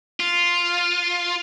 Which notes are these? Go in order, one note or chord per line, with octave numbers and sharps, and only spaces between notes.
F4